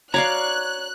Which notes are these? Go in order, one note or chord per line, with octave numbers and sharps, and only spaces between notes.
F#4 C#5 D5 F5 A#5 F#6